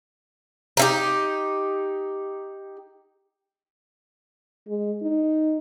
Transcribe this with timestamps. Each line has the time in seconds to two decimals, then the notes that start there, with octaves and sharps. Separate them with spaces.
0.77 D#4 E4 G4
4.68 G#3
5.02 D#4